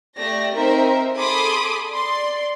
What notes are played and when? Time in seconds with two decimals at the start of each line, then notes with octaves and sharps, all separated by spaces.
0.16 A3 G4 D5 A#6
0.56 C4 D#4 A#4 C5 E5
1.16 G#4 A4 B5 C6 D6 D#6
1.89 D5 C6